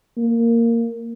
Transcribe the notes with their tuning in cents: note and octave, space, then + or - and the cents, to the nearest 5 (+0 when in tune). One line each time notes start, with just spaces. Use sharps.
A#3 -10